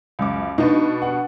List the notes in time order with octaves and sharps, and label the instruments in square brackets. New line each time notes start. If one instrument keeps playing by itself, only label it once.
[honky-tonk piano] C#2 F#2 D6
[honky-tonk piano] B2 D4 B4 [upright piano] D#4
[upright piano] F#5